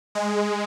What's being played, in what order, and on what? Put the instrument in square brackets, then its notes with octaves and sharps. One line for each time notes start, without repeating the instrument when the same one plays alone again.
[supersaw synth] G#3